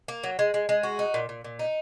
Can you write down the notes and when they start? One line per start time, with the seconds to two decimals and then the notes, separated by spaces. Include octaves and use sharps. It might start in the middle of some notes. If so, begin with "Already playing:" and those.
0.08 A#3
0.23 F#3
0.39 G#3
0.54 G#3
0.69 G#3
0.83 F#4
0.99 D#4
1.14 A#2
1.29 A#2
1.44 A#2
1.59 D#4